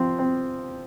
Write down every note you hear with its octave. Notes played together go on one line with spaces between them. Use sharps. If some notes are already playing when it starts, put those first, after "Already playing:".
Already playing: F3 C4
C4